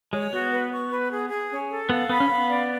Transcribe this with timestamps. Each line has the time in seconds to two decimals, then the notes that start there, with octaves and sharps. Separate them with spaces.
0.13 G#3 C#5
0.33 B3 F#4
0.53 B4
0.73 C#6
0.91 B4
1.11 G#4
1.30 G#4
1.51 C#4
1.70 A4
1.89 B3 F5
2.09 B3 B5
2.20 C#4
2.29 B3 F5
2.49 D5